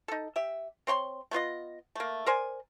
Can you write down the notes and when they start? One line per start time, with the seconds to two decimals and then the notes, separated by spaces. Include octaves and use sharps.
0.08 D#4 A4
0.36 G4 E5
0.87 C4 C#5 G5 C6
1.31 A3 B3 F4 D#5
1.95 A3 A#3
2.26 A#4 C5 D5 G#5